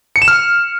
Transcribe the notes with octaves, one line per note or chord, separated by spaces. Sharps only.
C#7
E7
F6